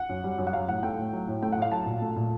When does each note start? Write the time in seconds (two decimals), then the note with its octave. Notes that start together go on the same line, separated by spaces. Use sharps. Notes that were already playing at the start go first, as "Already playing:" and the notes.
Already playing: F#5
0.09 F#2
0.24 G3
0.38 F#2
0.47 F#5
0.53 F#3 F5
0.68 A2 F#5
0.83 A3 G5
0.98 A2
1.13 F#3
1.28 A2
1.42 A3 G5
1.52 F#5
1.58 A2 F5
1.72 F#3 A5
1.86 A#2
2.02 A3
2.16 A#2